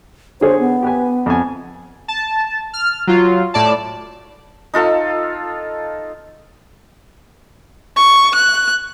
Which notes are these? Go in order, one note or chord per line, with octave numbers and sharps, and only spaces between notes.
D3 G#4 C5 C#5
B3
G4 B4 G#5
F2 G#5
A5
F6
F#3 F4
A2 D5 A5
D#4 F4 A4 F5
C#6
F#6